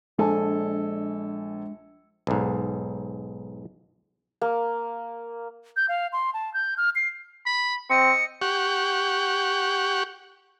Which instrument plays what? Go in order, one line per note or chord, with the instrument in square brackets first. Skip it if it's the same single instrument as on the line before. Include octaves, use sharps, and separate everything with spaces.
[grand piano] A#1 A4 G#5 [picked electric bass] G#3 D4
[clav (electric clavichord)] B1 G#2
[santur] A#3
[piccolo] G6
F5
C6
A5
G6
F6
C7
[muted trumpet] B5
[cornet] C4 [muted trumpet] D#5 [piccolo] C#7
[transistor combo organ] G4 F#5 C#6